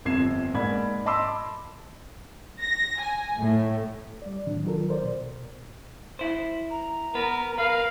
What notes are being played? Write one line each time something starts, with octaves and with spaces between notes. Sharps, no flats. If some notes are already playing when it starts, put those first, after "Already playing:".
G1 F2 C3 G#6 C7 E7
G#2 A#3 D5 B5 G#6
D#5 A5 B5 C6 D6 E6
A#6
G#5
A2
G3 D5
A2 C3 D#3 F#3 D4
D#3 F#3 F4 A4 A#4
A#4 C5 D5
B2
E4 C5
A#5
B3 A#4 B4
A#4 B4 F5